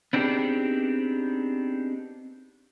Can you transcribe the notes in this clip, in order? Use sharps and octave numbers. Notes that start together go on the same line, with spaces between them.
B3 C4 D4 D#4 G4 G#4